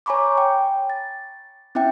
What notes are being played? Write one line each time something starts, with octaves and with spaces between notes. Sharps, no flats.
C#5 G#5 A#5 B5 C#6 D6
G5
A6
C4 C#4 E4 E5 G5